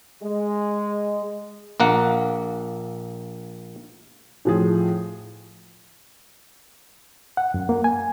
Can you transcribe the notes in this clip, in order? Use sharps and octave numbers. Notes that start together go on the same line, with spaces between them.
G#3
A#1 A#3 F#5
A2 F3 G#4
F#5
F#2
A#3
G#5